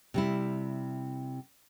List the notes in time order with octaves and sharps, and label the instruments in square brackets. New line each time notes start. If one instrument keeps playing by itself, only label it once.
[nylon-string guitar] C3 G3 E4